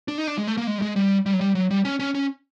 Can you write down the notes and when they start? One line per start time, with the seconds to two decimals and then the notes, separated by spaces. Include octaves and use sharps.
0.08 D4
0.18 D#4
0.27 D4
0.38 G#3
0.47 A3
0.57 A#3
0.67 G#3
0.78 G3
0.82 G#3
0.96 G3
1.26 G3
1.33 F#3
1.41 G3
1.55 F#3
1.71 G3
1.85 C#4
2.00 C#4
2.15 C#4